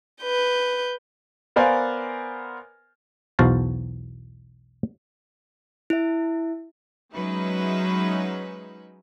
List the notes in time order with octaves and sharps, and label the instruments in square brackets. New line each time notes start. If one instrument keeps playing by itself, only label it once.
[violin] B4 G6
[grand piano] B3 A#4 C5 D5 F5 G#5
[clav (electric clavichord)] B1 E2 F#4 C5 F5 A5
[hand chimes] E4 E5
[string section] F#3 G#3 C#4 D#4 B4 E5